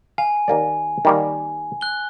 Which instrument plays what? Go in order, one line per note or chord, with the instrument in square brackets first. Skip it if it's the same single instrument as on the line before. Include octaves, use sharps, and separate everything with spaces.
[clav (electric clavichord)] F5 [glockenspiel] G#5
[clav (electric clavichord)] D#2 A#3 D5
D#3 G3 A#3
[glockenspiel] F#6 G7